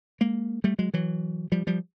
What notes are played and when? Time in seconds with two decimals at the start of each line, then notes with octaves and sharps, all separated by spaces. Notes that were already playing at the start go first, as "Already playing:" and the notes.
0.21 G#3 A#3
0.64 G3 A3
0.79 F#3 G#3
0.94 E3 F#3
1.52 F3 G3
1.67 F3 G3